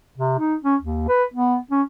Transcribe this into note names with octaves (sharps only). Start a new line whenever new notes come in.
C3
D#4
C#4
D#2
B4
B3
C#4